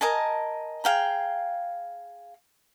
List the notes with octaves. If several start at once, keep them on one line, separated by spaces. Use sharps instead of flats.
A#4 D#5 G#5 A5
G#4 F5 G5 A#5